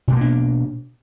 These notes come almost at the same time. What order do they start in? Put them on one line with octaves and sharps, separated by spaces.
B2 A3 A#3 D4